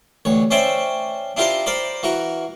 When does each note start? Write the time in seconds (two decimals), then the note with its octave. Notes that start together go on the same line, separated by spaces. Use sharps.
0.25 A1 D2 C#5
0.51 C#4 C5 D5 E5 G5 G#5
1.37 D4 E4 F4 G4 A#4 C5
1.66 A#4 C5 D5 B5
2.03 E3 F#4 A#4